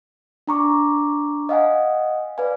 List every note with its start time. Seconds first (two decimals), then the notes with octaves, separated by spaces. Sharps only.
0.47 D4 A#5 C#6 D6
1.49 D#5 F5 F#5 G#5
2.38 B4 D5 F5 G#5